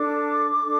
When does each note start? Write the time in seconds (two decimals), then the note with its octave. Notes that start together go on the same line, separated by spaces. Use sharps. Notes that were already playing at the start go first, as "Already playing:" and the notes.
Already playing: D4 A4 D6
0.63 D4 A4